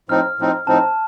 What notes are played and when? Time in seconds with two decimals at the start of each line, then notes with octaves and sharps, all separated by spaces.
0.09 A2 F3 C4 D#4 F6
0.39 A2 F3 C4 D#4
0.67 A2 F3 C4 D#4 A5